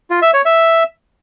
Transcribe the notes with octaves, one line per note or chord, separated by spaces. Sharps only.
F4
E5
C#5
E5